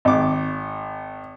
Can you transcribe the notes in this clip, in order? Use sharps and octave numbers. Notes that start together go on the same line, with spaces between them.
G#1 D6